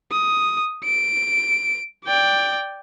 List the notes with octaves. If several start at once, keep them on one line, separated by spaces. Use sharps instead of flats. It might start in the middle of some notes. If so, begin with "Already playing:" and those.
D#6
D7
D5 G5